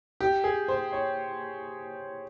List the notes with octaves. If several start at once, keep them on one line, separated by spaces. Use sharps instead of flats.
G4
G#4
C5
C#5